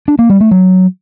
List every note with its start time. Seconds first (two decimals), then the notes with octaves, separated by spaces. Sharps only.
0.08 D4
0.19 A#3
0.30 G3
0.40 A3
0.51 F#3